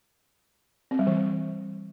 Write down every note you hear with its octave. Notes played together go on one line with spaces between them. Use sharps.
C4
G3
E3